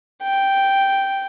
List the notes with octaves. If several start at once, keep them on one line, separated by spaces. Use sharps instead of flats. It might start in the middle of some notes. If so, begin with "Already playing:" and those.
G5